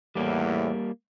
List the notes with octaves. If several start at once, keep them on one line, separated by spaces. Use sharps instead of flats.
E2 A2 G3 A#3